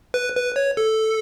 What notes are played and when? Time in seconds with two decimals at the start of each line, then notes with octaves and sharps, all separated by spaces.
0.14 B4
0.36 B4
0.56 C#5
0.77 A4